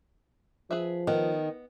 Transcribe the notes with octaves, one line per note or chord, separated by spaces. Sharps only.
F3 G#4 B4 E5
D#3 B3 D#5